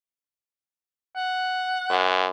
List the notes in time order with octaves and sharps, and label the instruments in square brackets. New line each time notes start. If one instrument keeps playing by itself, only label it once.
[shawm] F#5
[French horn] F#2